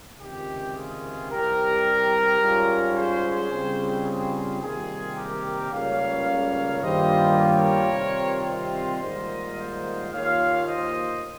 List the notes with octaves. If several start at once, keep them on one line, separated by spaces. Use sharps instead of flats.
C#2 C3 D#3 G4
F4 G#4
C2 C3 G3 G4 A#4
G#2 G3 C#4 F4
G#4 C5
C#3 G3 C4 F4
G#4 C5
C3 D#3 G3 A#3 F4 G#4
G4 A#4
C#2 C#3 G3 A#3 C#4 C#5 F5
G2 D#3 G3 A#3 F4 C5 D#5
A#4 C#5
C3 D#3 G3 C4 F4
C5 D#5
G#2 D#3 G3 A#3 F4
C5 D#5
D#2 D#3 A#3 F4 C#5 F5
C5 D#5